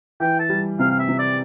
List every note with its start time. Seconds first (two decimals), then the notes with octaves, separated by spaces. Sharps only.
0.20 E3 G5
0.40 A5
0.49 G3
0.79 C3 F5
0.90 F5
0.99 E5
1.09 C3
1.19 D5